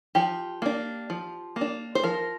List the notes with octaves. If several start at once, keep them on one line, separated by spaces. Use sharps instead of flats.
F3 G4
A#3 D4
F3
A#3
D4
C5
F3 A#4